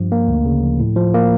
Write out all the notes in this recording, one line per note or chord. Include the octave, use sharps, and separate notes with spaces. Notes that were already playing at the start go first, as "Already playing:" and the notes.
Already playing: G2 F3
A#3
D2
C#3
F3
A2
F3
A#3